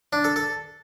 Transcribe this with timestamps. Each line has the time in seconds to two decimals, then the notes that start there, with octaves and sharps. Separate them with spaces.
0.13 D4
0.24 A4
0.36 A4